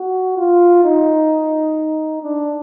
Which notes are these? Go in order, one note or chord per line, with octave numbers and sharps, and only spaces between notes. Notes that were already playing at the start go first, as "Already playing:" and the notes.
Already playing: F#4
F4
D#4
D4